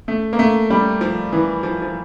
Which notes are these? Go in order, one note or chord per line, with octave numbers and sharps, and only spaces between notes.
A3
A#3
A3
G3
F3
E3
F3
F3